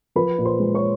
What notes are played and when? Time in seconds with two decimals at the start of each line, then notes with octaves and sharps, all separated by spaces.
0.16 F3 B4 B5
0.38 A#2
0.45 C5 C6
0.60 G#3
0.74 C#5 C#6